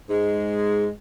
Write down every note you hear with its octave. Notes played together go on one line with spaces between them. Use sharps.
G#2 G#3